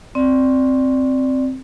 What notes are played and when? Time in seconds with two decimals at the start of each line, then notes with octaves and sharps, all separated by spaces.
0.15 C4 D5